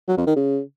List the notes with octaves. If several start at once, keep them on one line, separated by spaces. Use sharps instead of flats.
F#3
F2
D#3
C#3